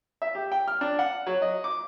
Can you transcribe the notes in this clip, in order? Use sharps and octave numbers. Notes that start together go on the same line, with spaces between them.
E5
G4
G5
F6
D4
F#5
F#3
D#5
D6